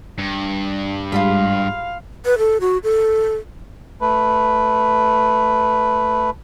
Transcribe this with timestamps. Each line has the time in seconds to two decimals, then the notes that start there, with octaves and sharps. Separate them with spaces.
0.18 G2
1.12 G#2 G3 G#3 F4 A#4 F5 B5
2.26 B4
2.38 A4
2.61 F#4
2.84 A4
4.01 A3 B4